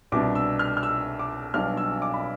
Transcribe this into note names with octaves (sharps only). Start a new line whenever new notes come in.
C2 B2 G3 D4 D6
E6
F6
F6
E6
D6
B1 B2 G3 D4 F6
E6
D6
B5